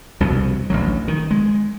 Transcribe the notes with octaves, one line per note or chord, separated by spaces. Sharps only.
C2 F2 B2
A1 D2 F#3
D#3
G#3